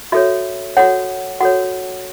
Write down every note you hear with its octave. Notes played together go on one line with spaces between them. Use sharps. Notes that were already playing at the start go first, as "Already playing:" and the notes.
F#4 A4 C#5 E5
F#4 A4 C#5 F#5
F#4 A4 C#5 F#5